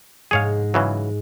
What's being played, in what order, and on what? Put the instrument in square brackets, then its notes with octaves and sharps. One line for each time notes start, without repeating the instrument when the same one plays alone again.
[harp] G#2 G#3 [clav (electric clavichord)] G#4 C#5 F5
[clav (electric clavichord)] C#3 E3 F#3